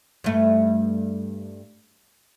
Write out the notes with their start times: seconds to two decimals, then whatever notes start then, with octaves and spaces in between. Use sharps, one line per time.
0.24 G2 A3